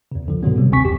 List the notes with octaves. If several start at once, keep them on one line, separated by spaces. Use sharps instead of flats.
E2 C#3
C2 D3 F3
G#2 B2 D3 D#3 F#3 B3
C3 G3
G#1 D2 C4 G#5 C#6 B6
A#1 F2 G4